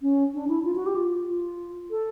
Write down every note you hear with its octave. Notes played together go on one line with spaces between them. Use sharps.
C#4
D4
E4
F4
F#4
G4
F4
F4
A4